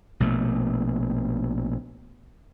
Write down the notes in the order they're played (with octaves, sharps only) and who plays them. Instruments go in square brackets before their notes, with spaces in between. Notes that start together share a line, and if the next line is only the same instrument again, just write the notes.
[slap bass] A#1 B2 A3